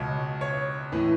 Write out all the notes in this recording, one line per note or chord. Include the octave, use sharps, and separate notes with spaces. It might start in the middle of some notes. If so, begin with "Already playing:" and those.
Already playing: C#2 B2 C#5
C#5
A2 E3